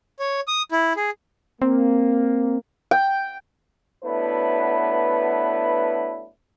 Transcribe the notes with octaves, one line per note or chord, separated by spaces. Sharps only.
C#5
D#6
E4
G#4
A#3 C4
G5
F#3 A3 B3 D4 E4 B4